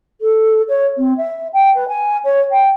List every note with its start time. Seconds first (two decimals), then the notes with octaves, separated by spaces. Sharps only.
0.21 A4
0.68 C#5
0.97 C4
1.17 E5
1.53 G5
1.74 B4
1.88 G#5
2.24 C#5
2.51 G5